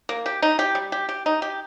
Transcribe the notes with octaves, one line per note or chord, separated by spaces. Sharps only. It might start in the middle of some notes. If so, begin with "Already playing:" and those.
A#3
G4
D#4
G4
G3
G4
G4
D#4
G4